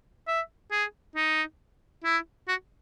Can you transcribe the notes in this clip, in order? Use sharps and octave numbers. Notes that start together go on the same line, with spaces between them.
E5
G#4
D#4
E4
F#4